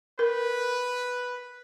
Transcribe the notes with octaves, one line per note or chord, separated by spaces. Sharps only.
A#4 B4